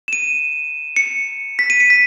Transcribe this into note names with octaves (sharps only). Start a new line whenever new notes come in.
E7
D#7
C#7
B6
D#7
C#7
B6